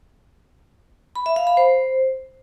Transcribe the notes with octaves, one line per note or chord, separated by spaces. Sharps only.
B5
E5
F5
B5
C5